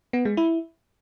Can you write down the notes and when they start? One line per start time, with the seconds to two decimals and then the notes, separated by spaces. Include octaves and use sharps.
0.13 B3
0.25 G#3
0.37 E4